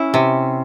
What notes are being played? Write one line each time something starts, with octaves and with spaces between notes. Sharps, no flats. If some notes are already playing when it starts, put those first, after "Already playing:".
Already playing: C#4 E4
C3